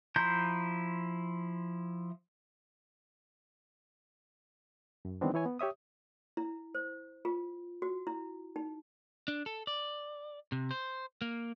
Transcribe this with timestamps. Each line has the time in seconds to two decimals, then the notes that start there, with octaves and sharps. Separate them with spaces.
0.16 F3 E4 A#5 C6 G6
5.05 F#2
5.21 D#3 E3 G3 B3 C4 D4
5.34 E3 E4 C#5 G#5
5.45 B3
5.59 G4 C#5 E5 D#6
6.37 E4
6.75 C5
7.25 F4
7.82 F#4
8.07 E4
8.56 D#4
9.28 D4
9.46 A4
9.67 D5
10.52 C3
10.71 C5
11.22 A#3